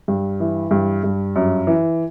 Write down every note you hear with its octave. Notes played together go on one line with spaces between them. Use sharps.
G2
E3
G2
G2
F#2
E3